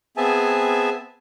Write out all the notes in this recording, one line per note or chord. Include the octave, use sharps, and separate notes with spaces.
B3 C4 G#4 E5 G#5 A5